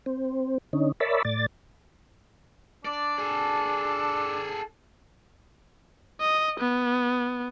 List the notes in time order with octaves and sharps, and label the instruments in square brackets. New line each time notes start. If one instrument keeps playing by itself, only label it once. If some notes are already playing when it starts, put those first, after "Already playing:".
[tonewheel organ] C4
D3 C#4 D#4
A#4 C#5 D5 E5 A5 B5
A2 D5 A6
[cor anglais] D4 [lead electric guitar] D5
[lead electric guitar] G#4 A4
[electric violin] D#5
B3